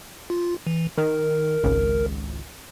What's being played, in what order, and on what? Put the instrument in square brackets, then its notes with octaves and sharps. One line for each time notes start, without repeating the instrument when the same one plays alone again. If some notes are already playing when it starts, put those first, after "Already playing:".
[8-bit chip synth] F4
E3
[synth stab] D#3 [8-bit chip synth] A#4
[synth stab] G#1 C#2